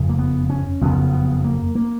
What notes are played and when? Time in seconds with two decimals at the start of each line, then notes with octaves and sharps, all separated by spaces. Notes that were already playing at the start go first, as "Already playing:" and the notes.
Already playing: F#1 F2 C#3
0.09 A#3
0.18 B3
0.50 C#4
0.81 F#1 F2 C#3 B3
1.12 B3
1.44 A#3
1.75 A#3